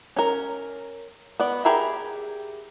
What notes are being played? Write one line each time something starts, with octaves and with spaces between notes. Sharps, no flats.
C#4 A#4
B3 D5
G4 G#4 A#4 E5 B5